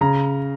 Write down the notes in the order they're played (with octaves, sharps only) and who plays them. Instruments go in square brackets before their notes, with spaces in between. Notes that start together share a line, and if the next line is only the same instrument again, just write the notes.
[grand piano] C#3 A#5